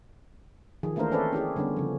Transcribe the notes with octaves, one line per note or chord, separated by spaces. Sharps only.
D#3 F3 G#4
E3 A3 A#3 D4 A#4 C5
C4 C#4 A4 B4 C5 D5
C#4 E4 G4 G#4
D3 G3 B3 C#4
C#3 F3